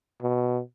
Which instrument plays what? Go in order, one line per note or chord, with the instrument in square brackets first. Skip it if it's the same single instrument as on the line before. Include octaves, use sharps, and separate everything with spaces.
[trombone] B2